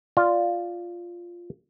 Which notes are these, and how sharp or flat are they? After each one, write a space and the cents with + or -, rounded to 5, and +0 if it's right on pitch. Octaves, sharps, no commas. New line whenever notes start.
F4 +0 D5 +0